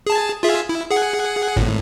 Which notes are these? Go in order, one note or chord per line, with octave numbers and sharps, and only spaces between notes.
G#4 A5
F4 G#4 E5
E4
G#4 F#5
G#1 A2